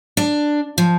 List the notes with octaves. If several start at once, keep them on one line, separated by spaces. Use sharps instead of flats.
D4
F3